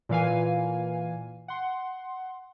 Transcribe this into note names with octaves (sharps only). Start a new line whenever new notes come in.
A#2 E3 F5 G#5
F#5 C6